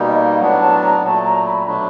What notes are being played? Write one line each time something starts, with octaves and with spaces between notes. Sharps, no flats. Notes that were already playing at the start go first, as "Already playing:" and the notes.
Already playing: B2 G3 A#3 D#4
D#5
F5
A2 F#3 B3 D4 F#5
A5
A#5
A#2 F#3 A3 A5
A#5
B5
B2 F#3 A3 D4 B5